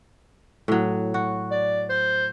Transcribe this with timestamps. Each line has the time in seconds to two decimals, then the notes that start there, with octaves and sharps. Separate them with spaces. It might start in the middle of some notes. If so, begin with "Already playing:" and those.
0.68 A2 F#3
1.14 F#4
1.51 D5
1.89 C5